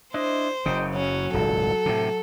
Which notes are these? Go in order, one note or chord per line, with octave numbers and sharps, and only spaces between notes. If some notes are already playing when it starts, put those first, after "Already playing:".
D4 E4 C5 D#5
F#1 F#2 C#3 D#5 G5
F#3 C#4
D#1 G#1 C#2 A4
A2 C3